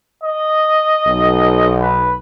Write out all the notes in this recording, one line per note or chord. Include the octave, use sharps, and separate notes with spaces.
D#5
B1
B4